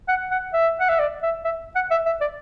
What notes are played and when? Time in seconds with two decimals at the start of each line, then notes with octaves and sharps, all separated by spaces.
0.08 F#5
0.31 F#5
0.53 E5
0.81 F#5
0.89 E5
0.99 D5
1.23 E5
1.45 E5
1.75 F#5
1.91 E5
2.06 E5
2.21 D5